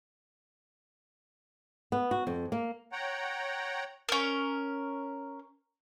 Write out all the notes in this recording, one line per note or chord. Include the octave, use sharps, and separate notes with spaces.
B3
F#4
F2
A#3
C#5 F#5 G5 A#5
C#4 A#4